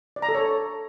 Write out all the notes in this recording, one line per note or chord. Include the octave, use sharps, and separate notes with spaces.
D5
A#5
A4
C#5